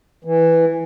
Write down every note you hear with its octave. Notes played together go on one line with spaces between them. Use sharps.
E3